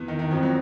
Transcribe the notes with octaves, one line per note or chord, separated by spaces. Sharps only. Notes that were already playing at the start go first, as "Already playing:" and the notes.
Already playing: E2 E3
D#3
D#3
F2 F3
F#3